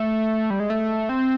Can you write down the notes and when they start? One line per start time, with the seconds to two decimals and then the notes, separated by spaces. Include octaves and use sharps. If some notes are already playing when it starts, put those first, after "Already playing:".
Already playing: A3
0.50 G3
0.60 G#3
0.70 A3
1.09 C4